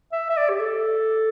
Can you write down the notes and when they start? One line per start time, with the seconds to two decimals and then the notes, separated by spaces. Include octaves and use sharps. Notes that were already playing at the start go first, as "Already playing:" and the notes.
0.12 E5
0.29 E5
0.37 D5
0.49 G4
0.59 A4